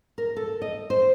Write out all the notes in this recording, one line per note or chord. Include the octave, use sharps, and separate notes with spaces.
A#4
A4
D#5
C5